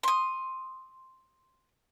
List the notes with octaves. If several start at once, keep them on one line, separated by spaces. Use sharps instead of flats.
C6 D#6